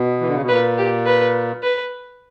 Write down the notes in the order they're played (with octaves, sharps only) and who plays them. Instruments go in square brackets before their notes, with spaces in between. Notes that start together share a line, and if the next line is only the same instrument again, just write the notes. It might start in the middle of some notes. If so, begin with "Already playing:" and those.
Already playing: [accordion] B2
E3
D3
C#3
B2
[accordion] A#2 [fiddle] B4
[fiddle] G4
B4
B4